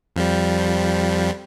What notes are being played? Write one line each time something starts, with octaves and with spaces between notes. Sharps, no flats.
F2 F3 G3